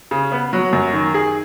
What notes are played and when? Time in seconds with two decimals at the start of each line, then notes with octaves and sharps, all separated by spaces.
0.11 C#3
0.32 B3
0.53 F#3
0.73 F#2
0.93 D#3
1.14 G#4